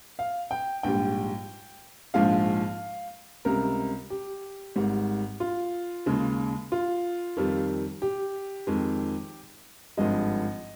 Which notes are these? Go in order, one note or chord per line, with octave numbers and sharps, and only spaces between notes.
F5
G5
A#1 G#2 G3 G5
A#1 G#2 F3 G#3 F5
C#2 C3 G3 A#4
G4
G#1 G#2 G3
F4
D#2 C#3 G#3
F4
F2 D#3 G3
G4
F2 D#3 G#3
G#1 G2 F3 G#3 D#5